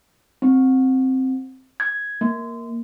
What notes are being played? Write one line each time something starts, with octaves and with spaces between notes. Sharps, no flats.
C4
G#6
A#3